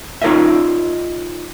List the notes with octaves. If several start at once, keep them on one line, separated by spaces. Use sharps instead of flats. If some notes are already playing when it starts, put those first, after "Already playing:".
D#4 F4 A#4 C#5 D#5 E5